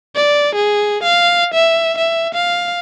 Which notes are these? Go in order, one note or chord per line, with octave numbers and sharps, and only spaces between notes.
D5
G#4
F5
E5
E5
F5